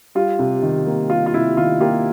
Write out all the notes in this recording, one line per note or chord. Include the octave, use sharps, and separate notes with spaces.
G3 F4
C3
D#3
A#3
G3 F4
F4
C3 E4
D#3 F4
A#3 F4 G4